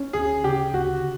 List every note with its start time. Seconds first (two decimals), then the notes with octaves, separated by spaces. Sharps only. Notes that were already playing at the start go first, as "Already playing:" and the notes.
Already playing: C#4
0.13 D2 G#4
0.44 C#3 G4
0.74 D2 F#4